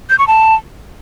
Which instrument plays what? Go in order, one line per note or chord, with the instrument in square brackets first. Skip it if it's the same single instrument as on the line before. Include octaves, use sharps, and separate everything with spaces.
[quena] G6
C#6
A5